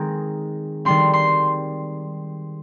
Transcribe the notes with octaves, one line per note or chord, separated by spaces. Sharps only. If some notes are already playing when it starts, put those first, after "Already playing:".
Already playing: D#3 G#3 C4 D#4
D#3 G3 C4 C6
C6